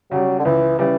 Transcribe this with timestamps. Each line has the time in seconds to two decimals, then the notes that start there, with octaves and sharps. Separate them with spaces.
0.11 C#3 F#3 G3
0.39 D3
0.45 C#2 E3
0.79 C#3 E3 G3